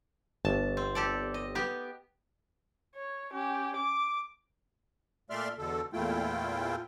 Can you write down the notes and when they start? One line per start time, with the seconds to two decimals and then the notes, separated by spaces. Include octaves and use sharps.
0.45 G1 A5
0.77 C4
0.95 G4 A4 D5
1.34 D#5
1.55 B3 G4
2.95 C#5
3.32 C#4 G4
3.76 D6
5.30 A#2 A3 D5 E5 C6 F6
5.58 E2 B2 D3 A4
5.93 E2 A#2 A3 E4 F4 G5